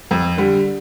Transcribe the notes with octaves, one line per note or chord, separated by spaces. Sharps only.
F2
D3 G3